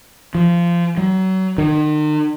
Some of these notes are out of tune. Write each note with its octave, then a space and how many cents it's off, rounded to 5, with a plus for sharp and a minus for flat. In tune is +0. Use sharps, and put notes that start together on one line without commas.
F3 -20
F#3 +30
D#3 -40